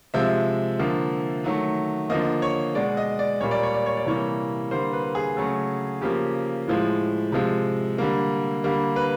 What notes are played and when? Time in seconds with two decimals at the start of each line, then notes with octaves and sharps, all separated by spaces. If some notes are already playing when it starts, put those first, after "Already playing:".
0.14 C3 F3 G#3 E5
0.79 D3 F3 A#3
1.44 D#3 F#3 A3
2.09 D3 F3 A#3 D#5
2.42 C#5
2.75 B2 G#3 D5
2.97 D#5
3.19 D5
3.41 A#2 G3 A#3 C#5
3.51 D5
3.63 C#5
3.74 D5
3.86 C#5
3.97 D5
4.06 C3 E3 G3 A#3 C#5
4.71 D3 G3 A#3 C5
4.93 B4
5.15 G#4
5.37 C#3 F#3 A3
6.01 C#3 F3 A#3 G4
6.68 A2 F3 G#3
7.32 C3 F3 G#3
7.98 D3 G3 A#3
8.64 D3 G3 A#3
8.96 B4